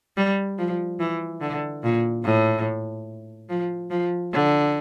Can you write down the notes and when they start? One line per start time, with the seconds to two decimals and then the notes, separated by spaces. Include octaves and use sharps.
0.17 G3
0.59 F3
1.00 E3
1.41 D3
1.84 A#2
2.24 A2
3.50 F3
3.90 F3
4.33 D3